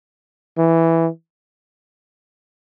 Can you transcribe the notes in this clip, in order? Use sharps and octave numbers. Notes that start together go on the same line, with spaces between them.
E3